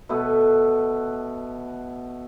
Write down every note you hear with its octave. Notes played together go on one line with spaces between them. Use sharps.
B2 A3 B3